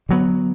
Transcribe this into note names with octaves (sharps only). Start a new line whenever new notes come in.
D3 F#3 B3